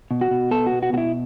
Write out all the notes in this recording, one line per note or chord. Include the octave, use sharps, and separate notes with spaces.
B2
F#4
B2
B3 A4
F#4
B2
F#4
B2 E4 F#4